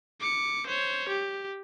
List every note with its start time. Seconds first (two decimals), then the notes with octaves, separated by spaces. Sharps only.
0.20 D6 C#7
0.67 C5 C#5
1.09 G4